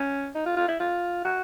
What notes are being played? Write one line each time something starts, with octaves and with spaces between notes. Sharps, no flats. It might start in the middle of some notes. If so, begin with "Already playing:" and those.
Already playing: C#4
D#4
F4
F4
E4
F4
F#4